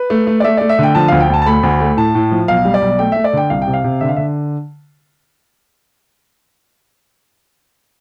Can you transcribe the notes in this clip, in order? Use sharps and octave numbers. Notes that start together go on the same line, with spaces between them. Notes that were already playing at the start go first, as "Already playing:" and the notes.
Already playing: B4
A3
A3
D5
A3 E5
A3 D5
E5
D3 G5
F3 A5
D2 F5
G5
D2 A5
A5
A3 B5
D2
A3
A2 A5
A2
F3
B1 F5
G3
D5
B1
A3 G5
A3 E5
D5
D3 G5
C2 F5
G5
C3
F5
C3
D3 E5
F5
D3 E5